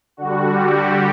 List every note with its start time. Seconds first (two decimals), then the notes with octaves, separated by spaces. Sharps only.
0.17 D3 G3 F#4
0.51 G3 G4